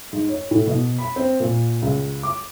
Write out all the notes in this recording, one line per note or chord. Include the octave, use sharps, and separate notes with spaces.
G#2
C#5
A2
B2
B5
C4
A#2
C#2
D6